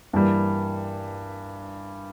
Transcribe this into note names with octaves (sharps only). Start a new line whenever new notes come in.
G2 E3 G3 A#3